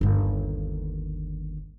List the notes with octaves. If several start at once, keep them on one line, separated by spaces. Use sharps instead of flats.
G1 D#2